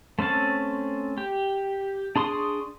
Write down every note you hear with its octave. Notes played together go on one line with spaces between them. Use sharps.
A3 C4 C#4 A5
G4
D4 G#4 C6 C#6 D#6